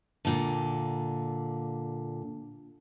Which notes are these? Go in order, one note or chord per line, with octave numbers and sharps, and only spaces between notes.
A#2 D3